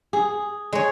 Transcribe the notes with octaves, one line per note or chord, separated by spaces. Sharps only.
G#4
G#3 C#5